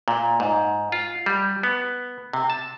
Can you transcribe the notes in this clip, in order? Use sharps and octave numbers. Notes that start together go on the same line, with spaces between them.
A#2
G#2
F4
G3
B3
C3
A5